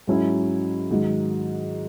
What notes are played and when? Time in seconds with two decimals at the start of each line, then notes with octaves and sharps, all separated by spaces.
0.07 G#2 F#3 C#4 E4
0.91 G#2 D#3 F#3